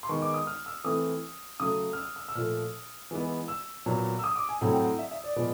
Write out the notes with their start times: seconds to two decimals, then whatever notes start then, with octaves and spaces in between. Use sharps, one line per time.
0.03 C6
0.09 D#3 G#3 B3 C#6
0.22 D6
0.34 D#6
0.47 F6
0.66 E6
0.84 E3 A3 C4 D#6
1.60 C#3 F#3 A3 D#6
1.93 F6
1.97 E6
2.16 E6
2.29 E6
2.35 A#2 F3 A3 F6
3.11 E3 G#3 B3
3.48 E6
3.86 A#2 F#3 B3
4.19 E6
4.24 D#6
4.36 D6
4.49 G#5
4.61 A2 F#3 A3 C4 F#5
4.73 G5
4.84 F#5
4.99 E5
5.11 E5
5.24 D5
5.36 A#2 F3 G#3 B3